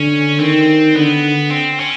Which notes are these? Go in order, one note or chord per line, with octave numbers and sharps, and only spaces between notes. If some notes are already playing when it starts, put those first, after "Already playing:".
Already playing: D3 C#4
D#3 C4
D3 B3
C4
C#4